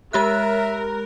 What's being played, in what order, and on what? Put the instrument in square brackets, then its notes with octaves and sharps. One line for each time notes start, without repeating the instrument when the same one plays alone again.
[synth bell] G#3 G4 F#6 [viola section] A#4 [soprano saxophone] E5